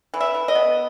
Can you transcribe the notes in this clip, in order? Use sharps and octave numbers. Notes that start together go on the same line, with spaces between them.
E3
E5
E3
D#5
B3